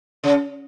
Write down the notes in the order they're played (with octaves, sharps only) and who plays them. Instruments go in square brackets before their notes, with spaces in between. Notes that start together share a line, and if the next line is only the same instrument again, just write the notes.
[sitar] C#3